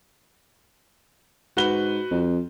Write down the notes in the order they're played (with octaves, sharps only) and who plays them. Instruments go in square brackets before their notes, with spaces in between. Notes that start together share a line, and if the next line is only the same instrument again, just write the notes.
[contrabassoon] G#2 [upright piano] F#4 B4 G7
[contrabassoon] F2